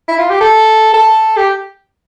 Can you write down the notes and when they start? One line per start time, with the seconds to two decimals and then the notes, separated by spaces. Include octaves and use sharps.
0.08 E4
0.19 F4
0.30 G4
0.41 A4
0.94 A4
1.37 G4